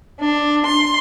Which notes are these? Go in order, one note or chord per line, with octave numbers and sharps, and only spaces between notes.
D4
C6